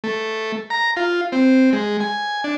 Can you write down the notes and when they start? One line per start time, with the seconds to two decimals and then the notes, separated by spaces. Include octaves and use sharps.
0.04 A3
0.70 A#5
0.96 F4
1.32 C4
1.73 G#3
2.00 G#5
2.44 D4